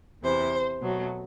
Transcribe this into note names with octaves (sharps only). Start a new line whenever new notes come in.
E2 C3 E3 C5
B2 F#3 A3